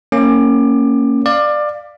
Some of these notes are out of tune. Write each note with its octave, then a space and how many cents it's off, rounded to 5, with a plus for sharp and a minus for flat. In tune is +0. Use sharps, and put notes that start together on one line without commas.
A#3 -20 C#4 -10 D6 +20
D5 +20 F5 +0